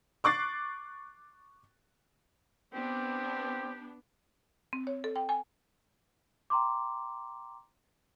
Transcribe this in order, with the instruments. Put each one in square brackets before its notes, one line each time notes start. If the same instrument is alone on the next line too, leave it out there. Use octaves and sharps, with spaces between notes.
[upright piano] C#6 D6 F#6 A6 C7
[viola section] B3 D4 [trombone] C4 [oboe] G4
[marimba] C4
C#5
A4
G5
G#5
[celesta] G5 A#5 C6 D6